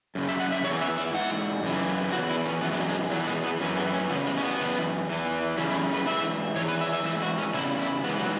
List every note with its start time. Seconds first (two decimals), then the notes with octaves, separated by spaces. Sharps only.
0.15 F#2 C#3
0.28 E5
0.40 F#5
0.52 E5
0.64 E2 E3 C#5
0.81 E5
0.98 E5
1.13 G#2 E3 F#5
1.63 F#2 C#3 E3
2.12 E2 E3 F#4
2.29 E4
2.46 C#4
2.61 F#2 E3 B3
2.71 G#3
2.81 F#3
2.89 G#3
3.10 E2 F#3
3.14 E3
3.27 G#3
3.44 B3
3.60 F#2 E3 C#4
3.77 B3
3.94 C#4
4.10 E2 C#3 B3
4.27 G#3
4.38 C#4
4.42 B3
4.59 F#2 E3
5.09 E2 E3
5.57 F#2 C#3 E3 C#4
5.70 E4
5.94 B4
6.06 G#2 E3 E5
6.56 E2 E3 C#5
6.69 B4
6.81 E5
6.93 E5
7.05 G#2 E3 E5
7.22 F#4
7.38 C#4
7.54 E2 C#3 E4
7.79 E4
8.03 G#2 B3
8.08 E3
8.18 F#3